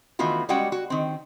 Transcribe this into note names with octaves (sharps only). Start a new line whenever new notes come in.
D#3 E3 A3 B3 F4 F#4
G3 G#3 C#4 F#4 F#5 G5
F#4
D#3 C4